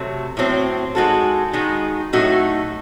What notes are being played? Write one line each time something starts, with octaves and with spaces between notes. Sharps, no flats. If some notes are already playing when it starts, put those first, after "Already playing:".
Already playing: C3 F#3 A3
A2 F#3 C4
G#3 D#4 F#4 A4
D#3 G#3 D#4 F#4
A2 F#3 A3 D#4 F#4